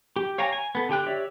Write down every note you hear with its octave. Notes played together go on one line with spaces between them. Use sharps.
G4
C#5 F5 G5 G#5 A#5
G#5
B3 A4
D3 G4 G5 F#6
G4 C#5 D5 E5